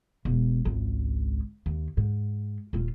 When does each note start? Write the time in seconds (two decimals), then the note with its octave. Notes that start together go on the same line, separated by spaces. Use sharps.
0.25 E1
0.65 G#1 C#2
1.66 D#2
1.97 G#2
2.73 D#1 F4